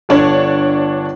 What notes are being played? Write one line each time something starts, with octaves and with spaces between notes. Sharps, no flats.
G1 D4 C#5